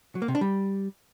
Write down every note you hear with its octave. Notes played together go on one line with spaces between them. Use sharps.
F#3
A#3
C3
D4
G3